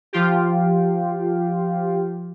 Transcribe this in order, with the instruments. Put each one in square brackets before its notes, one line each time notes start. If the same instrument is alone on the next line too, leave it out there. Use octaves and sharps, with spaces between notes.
[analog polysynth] F3 F4 G4